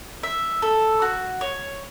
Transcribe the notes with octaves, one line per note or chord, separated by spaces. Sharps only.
E5
A4
F#4
C#5